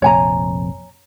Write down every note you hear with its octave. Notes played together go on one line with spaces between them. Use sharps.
F1 A#1 F2 C#5 G#5 A#5